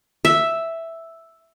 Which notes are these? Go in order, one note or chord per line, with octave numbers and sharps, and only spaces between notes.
E5